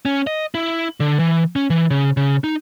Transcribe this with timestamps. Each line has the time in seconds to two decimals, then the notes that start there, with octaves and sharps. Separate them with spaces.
0.05 C#4
0.27 D#5
0.55 E4
1.00 D3
1.19 E3
1.56 C#4
1.70 E3
1.91 C#3
2.17 C#3
2.44 D#4